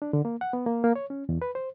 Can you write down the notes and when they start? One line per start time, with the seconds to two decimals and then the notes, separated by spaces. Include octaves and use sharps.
0.02 D4
0.13 D3
0.25 A#3
0.41 F#5
0.53 B3
0.66 A#3
0.84 A#3
0.96 C#5
1.10 C#4
1.29 E2
1.42 B4
1.55 C5